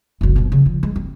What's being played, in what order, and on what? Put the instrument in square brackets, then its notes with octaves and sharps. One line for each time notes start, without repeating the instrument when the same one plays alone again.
[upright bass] F#1 B1
B2 F#3
C#3
F3
G#3
C4